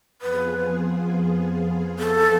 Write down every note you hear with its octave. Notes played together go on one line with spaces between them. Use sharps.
F2 F3 B3 F4 G#4 B4
A4